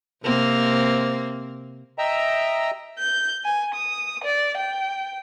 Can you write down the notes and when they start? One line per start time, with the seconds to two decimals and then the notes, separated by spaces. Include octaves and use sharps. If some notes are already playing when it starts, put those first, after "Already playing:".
0.23 C3 A#3 C4
1.98 D#5 E5 G5 A#5 E6
2.99 G6
3.45 G#5
3.74 D#6
4.24 D5
4.58 G5